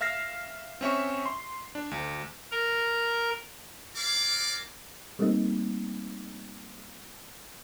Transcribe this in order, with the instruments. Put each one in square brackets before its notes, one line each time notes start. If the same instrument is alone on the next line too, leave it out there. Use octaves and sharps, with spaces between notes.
[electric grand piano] E5 F5 F6 A#6 C7
C4 C#4 E5 C#6
C6
D4
D2
[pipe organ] A#4 A#5
[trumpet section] A#4 C#5 D5 F5 D6
[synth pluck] G3 A3 A#3 C4 D#4